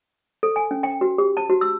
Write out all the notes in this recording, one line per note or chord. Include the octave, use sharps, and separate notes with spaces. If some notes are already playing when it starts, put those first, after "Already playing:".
A4
G#5
C#4
G5
F#4
G4
A5
F#4
E6